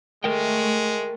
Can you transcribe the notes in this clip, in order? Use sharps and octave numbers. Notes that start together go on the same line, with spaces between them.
G#3 A3 A#4 G5